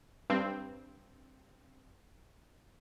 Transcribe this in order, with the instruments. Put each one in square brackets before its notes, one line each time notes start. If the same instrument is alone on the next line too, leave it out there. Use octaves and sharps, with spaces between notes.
[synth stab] G2 C4